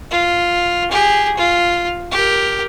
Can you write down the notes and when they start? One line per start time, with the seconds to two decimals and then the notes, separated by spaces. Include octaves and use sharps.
0.11 F4
0.91 G4 G#4
1.37 F4
2.12 G4 A#4